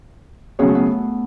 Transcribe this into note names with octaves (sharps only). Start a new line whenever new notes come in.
C#3 F#3 B3 C#4 G#4 C#5
A3
B3